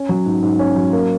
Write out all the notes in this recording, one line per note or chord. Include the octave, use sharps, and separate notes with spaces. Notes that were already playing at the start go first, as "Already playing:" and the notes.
Already playing: C#4
F#3
G#2
G#2
C#4
F#3
A#3